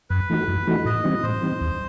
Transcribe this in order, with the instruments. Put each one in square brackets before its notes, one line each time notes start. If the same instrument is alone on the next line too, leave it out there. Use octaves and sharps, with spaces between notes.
[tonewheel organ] F#2 [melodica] B4
[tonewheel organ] E3 A3 D#4 F#4
F#2
E3 A3 D#4 F#4
[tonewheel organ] A2 [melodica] D#5
[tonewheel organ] E3 G3 C4 D#4
[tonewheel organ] A2 [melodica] C5
[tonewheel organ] E3 G3 C4 D#4
D#2